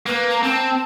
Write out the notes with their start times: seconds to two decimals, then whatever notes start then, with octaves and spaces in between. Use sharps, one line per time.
0.06 A#3 B4
0.30 A#5
0.43 C4 A5